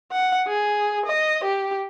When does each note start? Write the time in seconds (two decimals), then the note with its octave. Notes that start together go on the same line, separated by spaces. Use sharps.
0.12 F#5
0.47 G#4
1.06 D#5
1.44 G4